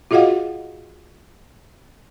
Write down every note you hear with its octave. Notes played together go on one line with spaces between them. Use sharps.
F4 F#4 G#4 D#5 F5 F#5